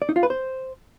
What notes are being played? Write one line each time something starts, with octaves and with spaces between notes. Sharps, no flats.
D5
D#4
F4
B4
C5